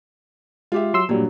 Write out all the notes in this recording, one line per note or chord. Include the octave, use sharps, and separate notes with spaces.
G#3 F4 G4 E5
F#3 C6 E6
G2 A#2 F#3 G3